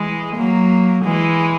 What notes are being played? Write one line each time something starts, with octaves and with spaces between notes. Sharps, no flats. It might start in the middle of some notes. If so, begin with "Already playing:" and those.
Already playing: E3 G#3
F#3 A#3
E3 G#3